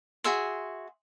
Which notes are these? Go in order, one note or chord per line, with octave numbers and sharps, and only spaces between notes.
F#4 G#4 E5 C6